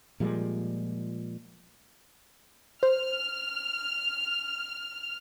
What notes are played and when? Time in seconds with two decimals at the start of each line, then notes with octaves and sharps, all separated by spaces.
0.20 A#2 F3 G3 G#3
2.83 C5 F6